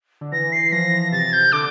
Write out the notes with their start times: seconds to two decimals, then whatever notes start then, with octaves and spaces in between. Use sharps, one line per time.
0.21 D3
0.32 E3 A#6
0.52 C7
0.72 F3 A#6
1.12 C3 A6
1.33 G6
1.52 D3 D6